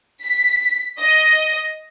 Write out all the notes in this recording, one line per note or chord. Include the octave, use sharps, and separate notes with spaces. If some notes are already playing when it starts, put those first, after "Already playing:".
B6
D#5